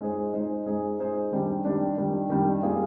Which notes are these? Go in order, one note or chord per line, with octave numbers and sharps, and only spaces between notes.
G#3 D#4 G#4 C5
G#3 D#4 G#4 C5
G#3 D#4 G#4 C5
G#3 D#4 G#4 C5
D#3 G3 D4
D#3 G3 D4
D#3 G3 D4
D#3 G3 D4
G3 A#3 F4 G#4